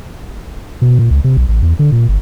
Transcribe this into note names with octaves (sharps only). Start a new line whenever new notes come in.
B2
A#2
C#2
C3
B1
A1
E2
D3
A#2
G1